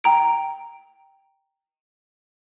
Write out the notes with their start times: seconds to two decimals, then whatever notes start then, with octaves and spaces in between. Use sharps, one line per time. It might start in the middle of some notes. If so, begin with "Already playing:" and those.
0.04 G5 A#5 D7